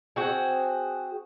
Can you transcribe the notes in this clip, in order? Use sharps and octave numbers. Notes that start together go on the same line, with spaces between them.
C4 F#4 G#4